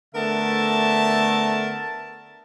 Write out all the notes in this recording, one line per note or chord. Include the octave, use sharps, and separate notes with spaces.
D3 A3 B3 A#4 E5 A5